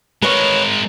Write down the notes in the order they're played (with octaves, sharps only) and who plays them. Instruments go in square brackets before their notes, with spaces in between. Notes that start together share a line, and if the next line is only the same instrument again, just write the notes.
[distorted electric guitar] G#3 A#4 [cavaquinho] B4 C#5